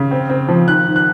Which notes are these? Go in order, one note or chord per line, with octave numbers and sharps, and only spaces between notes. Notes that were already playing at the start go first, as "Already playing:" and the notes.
Already playing: C#3
C4
C4
F3
D#3 F#6
D#3
F#6